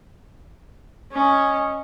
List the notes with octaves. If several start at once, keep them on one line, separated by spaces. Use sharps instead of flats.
C#4 D#5